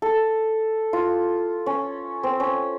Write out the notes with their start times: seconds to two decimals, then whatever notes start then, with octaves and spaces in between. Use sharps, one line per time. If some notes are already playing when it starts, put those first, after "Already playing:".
0.02 A4
0.93 F4
1.66 C#4
2.23 C4
2.40 C#4